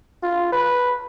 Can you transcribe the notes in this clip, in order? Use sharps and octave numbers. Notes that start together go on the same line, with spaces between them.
F4
B4